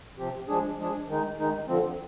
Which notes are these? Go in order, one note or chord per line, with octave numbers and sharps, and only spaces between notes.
C3 F3 C4 G4
F3 G#3 D4 G#4
F3 G#3 D4 G#4
D#3 G#3 D#4
D#3 G#3 D#4
D3 F3 C4